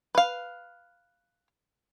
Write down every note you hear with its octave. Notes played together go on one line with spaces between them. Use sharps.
B4 F5